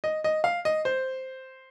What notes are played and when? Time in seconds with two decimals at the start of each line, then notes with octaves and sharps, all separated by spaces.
0.04 D#5
0.24 D#5
0.44 F5
0.65 D#5
0.85 C5